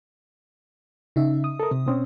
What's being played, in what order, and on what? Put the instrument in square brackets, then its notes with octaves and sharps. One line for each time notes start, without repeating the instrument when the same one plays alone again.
[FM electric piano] C#3 D#4 E5
D#6
[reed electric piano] A4 A#4
C3
B2 C4 C#4